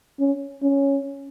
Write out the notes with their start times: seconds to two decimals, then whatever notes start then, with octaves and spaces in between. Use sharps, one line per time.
0.20 C#4
0.62 C#4